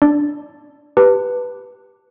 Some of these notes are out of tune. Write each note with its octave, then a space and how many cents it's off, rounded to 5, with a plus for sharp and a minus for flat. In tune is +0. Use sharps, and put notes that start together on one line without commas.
D4 +0 D5 +0
G4 +0 B4 +0 A5 +30